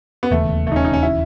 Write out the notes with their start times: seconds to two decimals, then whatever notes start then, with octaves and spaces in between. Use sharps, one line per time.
0.23 B3
0.31 E1 D#2 C#3 E3 A3
0.67 A3
0.72 D#4
0.76 C#4
0.84 D#4
0.93 C#4
1.03 E4